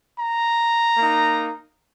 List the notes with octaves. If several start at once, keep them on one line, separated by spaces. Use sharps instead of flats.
A#5
A#3 D#4